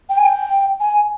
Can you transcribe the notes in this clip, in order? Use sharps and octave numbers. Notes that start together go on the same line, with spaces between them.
G5
G#5
G5
G#5